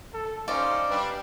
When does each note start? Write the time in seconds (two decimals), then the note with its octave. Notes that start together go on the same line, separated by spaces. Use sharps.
0.14 A4
0.48 C#4 D#4 C5 D5 D#5 F5
0.89 G3 D4 B4